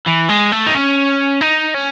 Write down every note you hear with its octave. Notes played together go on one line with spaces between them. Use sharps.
E3
G#3
A3
D#4
C#4
D#4
C#4